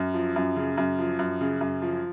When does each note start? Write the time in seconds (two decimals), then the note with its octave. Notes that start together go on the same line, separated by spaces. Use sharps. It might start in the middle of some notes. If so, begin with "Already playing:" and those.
Already playing: F#2
0.14 F3
0.36 F#2
0.56 C#3
0.77 F#2
0.99 F3
1.19 F#2
1.41 C#3
1.61 F#2
1.82 F3